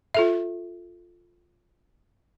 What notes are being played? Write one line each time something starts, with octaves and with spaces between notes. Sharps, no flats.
F4 A4 E5